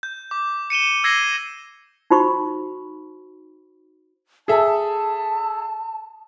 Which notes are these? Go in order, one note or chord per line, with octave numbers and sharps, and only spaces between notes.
G6
D6
C#7 D#7 E7 G7
E6 G#6 A#6 C7 D#7 G7
D#4 F#4 C5 B5 C#6
G#4 A4 E5 A5